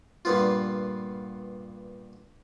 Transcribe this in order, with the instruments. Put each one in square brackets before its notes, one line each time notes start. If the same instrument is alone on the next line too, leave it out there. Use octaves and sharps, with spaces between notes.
[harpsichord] G2 A#2 B3 F4